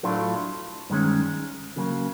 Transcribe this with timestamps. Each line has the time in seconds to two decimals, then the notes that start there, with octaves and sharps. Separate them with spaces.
0.03 A2 F#3 A3 D4 F4
0.90 G2 D#3 G#3 C#4
1.76 C#3 F#3 A#3